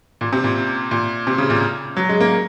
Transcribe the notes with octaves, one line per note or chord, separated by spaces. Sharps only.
A#2
C3
A#2
A#2
C3
C#3
A#2
F#3
G#3
A#3